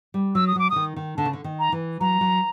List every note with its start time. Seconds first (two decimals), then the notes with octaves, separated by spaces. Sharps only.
0.14 G3
0.35 F#3 E6
0.47 D#6
0.56 F#3 D6
0.70 E3 D#6
0.76 D#3
0.96 D#3
1.17 D3 A5
1.25 C#3
1.33 D3
1.44 D#3
1.59 A#5
1.72 E3
2.00 F#3 A#5
2.21 F#3